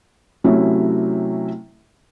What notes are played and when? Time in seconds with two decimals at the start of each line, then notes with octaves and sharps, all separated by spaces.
0.44 C3 F#3 A3 C#4 E4